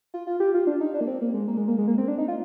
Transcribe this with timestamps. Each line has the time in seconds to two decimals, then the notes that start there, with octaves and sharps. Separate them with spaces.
0.14 F4
0.27 F4
0.40 G4
0.54 F4
0.67 D4
0.81 D#4
0.94 D4
1.01 A#3
1.08 C4
1.21 A#3
1.34 G#3
1.48 A#3
1.57 G#3
1.68 A#3
1.78 G#3
1.88 A#3
1.98 C4
2.08 D4
2.18 D#4
2.28 F4